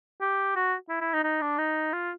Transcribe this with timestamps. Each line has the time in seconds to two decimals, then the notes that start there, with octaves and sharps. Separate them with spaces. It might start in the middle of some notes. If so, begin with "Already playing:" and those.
0.21 G4
0.56 F#4
0.89 E4
1.01 E4
1.13 D#4
1.24 D#4
1.41 D4
1.58 D#4
1.93 F4